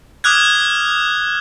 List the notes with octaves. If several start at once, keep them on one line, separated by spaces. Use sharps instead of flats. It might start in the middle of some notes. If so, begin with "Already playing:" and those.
D6 D#6 F6 F#6 G#6